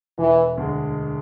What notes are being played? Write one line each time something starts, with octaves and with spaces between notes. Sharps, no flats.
E1 E3
D2 D3 G#3